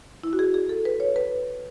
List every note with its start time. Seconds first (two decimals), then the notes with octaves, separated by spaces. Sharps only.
0.23 E4
0.33 F#4
0.39 G#4
0.54 G#4
0.69 A4
0.85 B4
1.00 C#5
1.16 B4